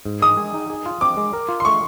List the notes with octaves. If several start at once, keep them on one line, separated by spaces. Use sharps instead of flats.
G#2
G#3 D#6
G#4
D#4
G#4
F4
C4 D6
G#3
A#4
F4
C6
A3 C#6